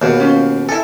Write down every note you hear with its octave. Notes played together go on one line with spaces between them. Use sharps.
D#2 B2 F#4 G#4
C#4 F4 C5
E4 A4 E5 G#5